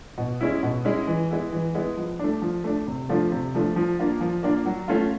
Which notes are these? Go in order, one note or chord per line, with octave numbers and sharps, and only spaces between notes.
B2
G#3 C#4 E4
B2
G#3 C#4 E4
E3
G#3 B3 E4
E3
G#3 B3 E4
F3
A3 D4
F3
A3 D4
C3
F3 A3 D4 F4
C3
F3 A3 D4 F4
F3
A#3 D4 F4
F3
A#3 D4 F4
F#3
A3 C#4 F4